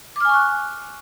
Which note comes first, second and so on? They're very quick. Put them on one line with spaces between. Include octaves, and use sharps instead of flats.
D6 F6 G#5 C#6 F#6